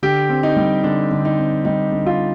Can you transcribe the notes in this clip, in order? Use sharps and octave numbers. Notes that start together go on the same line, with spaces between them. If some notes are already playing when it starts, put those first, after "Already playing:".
D3 G4
C4
D#4
G3
D3 D4
D3
D#4
C4
G3 D#4
D3
F4